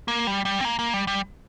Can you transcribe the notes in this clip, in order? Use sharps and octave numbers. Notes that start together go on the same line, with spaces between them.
A#3
G3
G3
C4
A#3
A#3
G3
G3